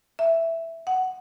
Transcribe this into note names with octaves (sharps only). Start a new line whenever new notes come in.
E5
F#5